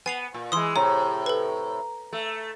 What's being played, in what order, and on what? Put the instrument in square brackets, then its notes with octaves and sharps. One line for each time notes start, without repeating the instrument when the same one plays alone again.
[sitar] B3 [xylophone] G#5 C7 F7
[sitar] A#2
[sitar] E3 G#3 [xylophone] C6 D#6
[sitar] A2 C3 [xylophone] C#5 [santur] A#5
[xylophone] A4 B4
[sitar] A3